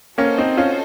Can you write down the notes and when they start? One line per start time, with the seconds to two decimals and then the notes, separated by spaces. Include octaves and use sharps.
0.18 A#3 C#4 F#4 A4 C5 D#5
0.38 C4 D#4
0.57 C#4 F4